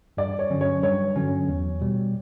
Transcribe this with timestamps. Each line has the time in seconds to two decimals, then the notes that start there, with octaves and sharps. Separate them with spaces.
0.17 G2 D5
0.39 C#5
0.50 D3 F#3 C#4
0.61 C#5
0.83 G2 C#5
1.16 D3 F#3 C#4
1.49 E2
1.81 B2 G3